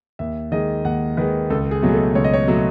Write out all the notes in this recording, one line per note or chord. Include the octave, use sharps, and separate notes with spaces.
D#2 E5
D#3 G#3 D#5
D#2 F#5
D#3 G#3 B4
C#2 A4
G#4
B2 F#3 A3
G#4
A4
C#2 C#5
D#5
C#5
B2 F#3 A3